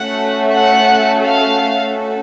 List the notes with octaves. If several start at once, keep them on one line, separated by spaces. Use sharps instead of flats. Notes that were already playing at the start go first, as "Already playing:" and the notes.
Already playing: A3 C#4 F#4 A4 F#5
F#5
F5